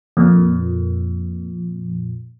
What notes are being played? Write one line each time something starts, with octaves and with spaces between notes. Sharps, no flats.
F2 A#2